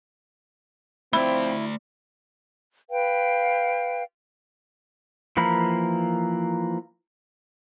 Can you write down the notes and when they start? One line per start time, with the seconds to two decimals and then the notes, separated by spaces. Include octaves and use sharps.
1.13 F3 A3 C4 E4 D5 B5
2.89 B4 F5 G5
5.37 E3 F3 A#3 A#4 B5